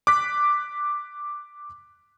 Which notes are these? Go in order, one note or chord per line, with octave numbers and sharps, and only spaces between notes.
D6 F#6 B6